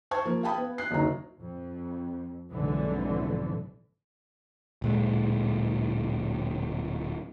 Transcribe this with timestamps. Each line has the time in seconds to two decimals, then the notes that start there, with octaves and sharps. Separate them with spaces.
0.11 C5 A5 C#6 G#6
0.26 F3 A#3
0.43 F5 G5 A5 B5 D#6
0.58 B3
0.78 F#6 C7
0.91 F#1 D2 D#4 F#4 A#5
1.41 F2
2.52 F1 B1 G#2 D3 E3
4.82 D1 A#2 G#3